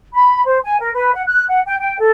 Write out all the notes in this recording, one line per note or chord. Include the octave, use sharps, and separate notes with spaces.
B5
C5
G#5
A#4
B4
F#5
F#6
F#5
G5
G5
A4